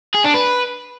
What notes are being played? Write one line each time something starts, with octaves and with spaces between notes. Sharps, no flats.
G#4
D4
B4